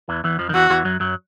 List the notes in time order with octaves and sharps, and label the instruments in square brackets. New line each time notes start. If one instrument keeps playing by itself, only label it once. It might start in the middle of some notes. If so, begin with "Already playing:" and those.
[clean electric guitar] E2 E3
E2 E3
F2 F3
D#3
[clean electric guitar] E2 E3 [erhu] F#4
[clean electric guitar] E2 E3
F#2 F#3
F#2 F#3